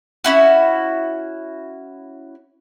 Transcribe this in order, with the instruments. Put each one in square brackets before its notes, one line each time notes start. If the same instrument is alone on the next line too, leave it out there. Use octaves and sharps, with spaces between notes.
[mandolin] C#4 E4 F#4